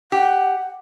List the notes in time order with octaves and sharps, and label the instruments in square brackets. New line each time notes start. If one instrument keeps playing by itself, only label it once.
[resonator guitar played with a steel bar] G4 [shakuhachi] F#5